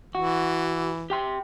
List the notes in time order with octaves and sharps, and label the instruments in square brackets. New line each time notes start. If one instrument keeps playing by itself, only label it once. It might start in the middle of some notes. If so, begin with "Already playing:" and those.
[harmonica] E3 [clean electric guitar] F#4
[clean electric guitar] G4 G5 C6